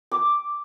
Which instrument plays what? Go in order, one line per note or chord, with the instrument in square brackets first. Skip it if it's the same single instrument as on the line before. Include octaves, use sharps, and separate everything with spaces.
[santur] D6